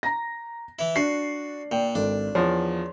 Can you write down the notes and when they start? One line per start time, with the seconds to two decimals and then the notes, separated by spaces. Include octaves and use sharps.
0.03 A#5 A#6
0.79 E3 E4
0.96 D4 F#4 C7
1.72 A#2 G5
1.95 G#1 D4 A4
2.35 E2 F3 C#5 C6